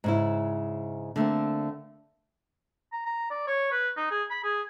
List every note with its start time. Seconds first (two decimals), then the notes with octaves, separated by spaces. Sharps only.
0.04 G#2 C#3 E4
1.16 D3 A3 A#3 C4
2.93 A#5
3.06 A#5
3.30 D5
3.47 C#5
3.71 B4
3.97 D#4
4.11 G#4
4.30 B5
4.44 G#4